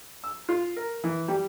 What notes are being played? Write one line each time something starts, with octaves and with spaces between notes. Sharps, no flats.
E6
F4
A#4
E3
G3